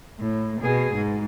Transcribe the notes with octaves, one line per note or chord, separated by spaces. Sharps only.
A2
B2 G#4
G#2